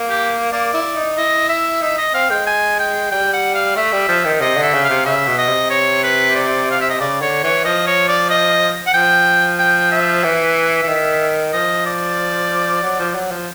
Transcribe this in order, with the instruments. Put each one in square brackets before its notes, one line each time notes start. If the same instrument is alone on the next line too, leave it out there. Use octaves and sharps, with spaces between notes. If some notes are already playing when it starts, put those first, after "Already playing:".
Already playing: [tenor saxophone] A#3
[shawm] G4
[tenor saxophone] A#3 [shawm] D5
[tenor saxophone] E4
D#4
[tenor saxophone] E4 [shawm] D#5
[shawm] E5
[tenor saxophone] D#4 [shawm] E5
[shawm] D#5
[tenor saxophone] C4 [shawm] F5
[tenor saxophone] G#3 [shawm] G5
[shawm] G#5
G5
[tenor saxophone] G3 [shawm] G5
[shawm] F#5
F5
[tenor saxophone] A3 [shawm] E5
[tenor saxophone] G3
F3
D#3
[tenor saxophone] C3 [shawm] D#5
[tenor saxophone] D3
[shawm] E5
[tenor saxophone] C#3
[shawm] F5
[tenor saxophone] C3
[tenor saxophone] C#3 [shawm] E5
[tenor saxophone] B2
[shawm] D#5
[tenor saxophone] C3
[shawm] C#5
B4
D5
F5
E5
D#5
[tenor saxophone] C#3 [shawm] D5
[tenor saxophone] D3 [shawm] C#5
[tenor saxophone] E3 [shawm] C#5
[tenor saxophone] F3 [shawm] D#5
[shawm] C#5
D5
D#5
F#5
[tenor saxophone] F3 [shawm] G5
[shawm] G5
E5
[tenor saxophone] E3
E3
D#3
[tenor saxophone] F3 [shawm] D#5
[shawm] D5
[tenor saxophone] F#3
F3
F#3
F3